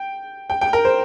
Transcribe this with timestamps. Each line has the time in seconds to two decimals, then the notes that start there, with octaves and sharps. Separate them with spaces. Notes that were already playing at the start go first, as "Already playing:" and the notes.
Already playing: G5
0.50 G5
0.61 G5
0.73 A#4
0.85 C5